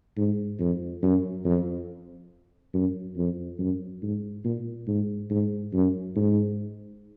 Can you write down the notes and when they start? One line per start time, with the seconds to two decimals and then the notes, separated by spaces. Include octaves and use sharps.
0.17 G#2
0.60 F2
1.02 F#2
1.45 F2
2.73 F#2
3.16 F2
3.59 F#2
4.02 G#2
4.45 A#2
4.87 G#2
5.30 G#2
5.73 F#2
6.15 G#2